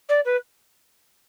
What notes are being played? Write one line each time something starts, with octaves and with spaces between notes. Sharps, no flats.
D5
B4